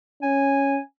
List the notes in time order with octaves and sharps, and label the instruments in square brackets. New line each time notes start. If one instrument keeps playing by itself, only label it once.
[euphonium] C#4 [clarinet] G#5